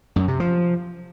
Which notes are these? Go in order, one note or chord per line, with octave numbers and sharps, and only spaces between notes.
F#2
C3
F3